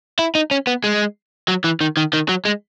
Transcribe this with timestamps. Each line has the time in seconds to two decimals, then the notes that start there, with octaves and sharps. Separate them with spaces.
0.19 E4
0.35 D#4
0.51 C#4
0.67 B3
0.84 G#3
1.48 F#3
1.64 E3
1.81 D#3
1.97 D#3
2.13 D#3
2.29 F#3
2.45 G#3